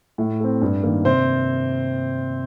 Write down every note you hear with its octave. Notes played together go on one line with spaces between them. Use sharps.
A2
A3 C4
G2
D#3 A#3
C3 C4 C5